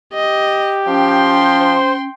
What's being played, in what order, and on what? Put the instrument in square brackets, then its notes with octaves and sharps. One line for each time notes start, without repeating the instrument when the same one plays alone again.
[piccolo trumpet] G4 [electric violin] D#5
[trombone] F3 [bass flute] C#4 [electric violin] G5 C6
[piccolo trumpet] C5